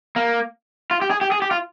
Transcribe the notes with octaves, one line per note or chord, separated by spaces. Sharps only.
A#3
F4
G4
G#4
G4
G#4
G4
F4